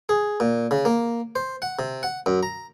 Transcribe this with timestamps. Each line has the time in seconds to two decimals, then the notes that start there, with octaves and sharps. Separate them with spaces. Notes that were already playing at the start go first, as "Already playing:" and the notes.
0.09 G#4
0.40 A#2
0.71 C#3
0.85 A#3
1.36 C5
1.62 F#5
1.79 C3
2.03 F#5
2.26 F#2
2.43 A#5